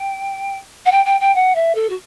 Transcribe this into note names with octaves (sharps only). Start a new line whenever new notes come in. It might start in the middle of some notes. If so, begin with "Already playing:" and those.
Already playing: G5
F#5
G5
G5
G5
F#5
E5
A4
F#4